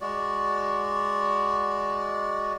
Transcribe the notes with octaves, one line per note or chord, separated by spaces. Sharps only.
G#3 F#4 D5